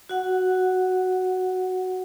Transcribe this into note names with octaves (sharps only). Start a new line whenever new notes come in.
F#4 F#5